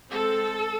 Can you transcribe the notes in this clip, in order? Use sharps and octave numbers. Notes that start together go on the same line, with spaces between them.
G#3 C4 A4